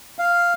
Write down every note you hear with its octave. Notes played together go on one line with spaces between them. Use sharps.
F5